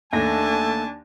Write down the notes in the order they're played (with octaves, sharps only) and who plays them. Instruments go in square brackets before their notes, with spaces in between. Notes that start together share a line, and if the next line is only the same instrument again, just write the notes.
[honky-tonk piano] D#2 A#6 [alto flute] A3 [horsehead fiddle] D4 G#5 [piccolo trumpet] A5